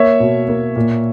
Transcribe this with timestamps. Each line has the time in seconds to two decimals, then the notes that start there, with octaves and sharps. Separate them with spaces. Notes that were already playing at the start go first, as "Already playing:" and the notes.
Already playing: A#3 C#5 E5
0.20 B2
0.48 A#3
0.76 A#2